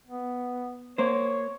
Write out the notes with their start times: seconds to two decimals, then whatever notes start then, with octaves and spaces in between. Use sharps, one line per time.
0.07 B3
0.98 A#3 C5 C#5